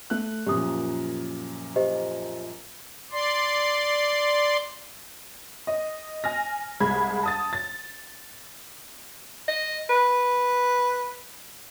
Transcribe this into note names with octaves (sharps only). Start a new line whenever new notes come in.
A3 F#6
F#2 A#2 F3 G4 D#6
G4 C5 D#5
D5 C6
D#5
G#5 F6 A#6
C2 G#3 B5 G#6
A5 D#6 A6
A6
D#5
B4